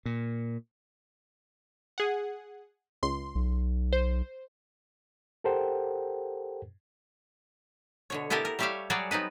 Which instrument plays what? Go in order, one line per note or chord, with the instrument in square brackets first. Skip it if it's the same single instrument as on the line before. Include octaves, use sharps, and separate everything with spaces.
[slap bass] A#2
[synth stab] G#4 F#5
C#2 C6
[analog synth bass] B1
[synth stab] C5
[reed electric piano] G4 A4 A#4 C5 F#5 G5
[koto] B2 D3 C#5
B3 E4 G4 A4 A#4
A#4
G3 A3 G4 C#5 E5 F5
F#3 G3 F#4 G#4 C#5 D5
B3 C4 D#4 B4